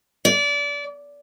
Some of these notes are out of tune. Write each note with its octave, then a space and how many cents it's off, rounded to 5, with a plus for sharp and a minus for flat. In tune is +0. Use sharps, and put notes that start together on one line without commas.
D5 -25